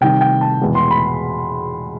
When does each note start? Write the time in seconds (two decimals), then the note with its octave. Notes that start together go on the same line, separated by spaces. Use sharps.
0.01 C3 D#3 G3 G5
0.21 G5
0.41 A5
0.61 E2 B2 G#3 B3
0.75 C6
0.91 B5